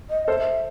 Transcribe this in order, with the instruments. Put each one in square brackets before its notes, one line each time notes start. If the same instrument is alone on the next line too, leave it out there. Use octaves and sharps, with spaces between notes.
[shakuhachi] D#5
[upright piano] A4 C5 [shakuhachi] E5